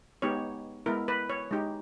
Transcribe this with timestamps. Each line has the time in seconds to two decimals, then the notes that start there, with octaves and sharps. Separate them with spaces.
0.22 G#3 B3 D#4 G4 C#5
0.86 G#3 B3 E4 A#4
1.08 B4
1.30 C#5
1.51 G#3 D#4 G4